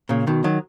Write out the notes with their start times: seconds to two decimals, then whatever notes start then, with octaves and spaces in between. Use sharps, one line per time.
0.09 A#2 C#3
0.27 B2 D#3
0.44 D#3 F#3